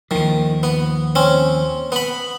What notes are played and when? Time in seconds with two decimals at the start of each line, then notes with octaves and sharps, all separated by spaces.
0.11 D#2 D#3 F3
0.63 B3
1.15 C4 C#4
1.92 B3 B5